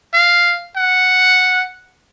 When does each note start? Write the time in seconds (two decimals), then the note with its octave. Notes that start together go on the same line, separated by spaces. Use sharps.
0.14 F5
0.76 F#5